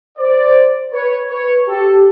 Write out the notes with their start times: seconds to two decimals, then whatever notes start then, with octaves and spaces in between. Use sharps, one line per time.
0.18 C5 D5
0.93 B4 C#5
1.30 B4 C#5
1.68 G4 A4